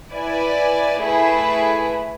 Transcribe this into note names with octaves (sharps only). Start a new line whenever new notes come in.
E4 B4 D5 G#5
A3 E4 G#4 B4